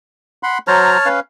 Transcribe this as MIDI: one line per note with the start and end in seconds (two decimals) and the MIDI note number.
0.43 0.58 78
0.43 0.58 83
0.43 0.58 84
0.68 0.98 54
0.68 0.98 72
0.68 1.08 73
0.68 1.08 81
0.68 0.98 82
0.68 1.08 89
1.05 1.20 61
1.05 1.20 71
1.05 1.20 77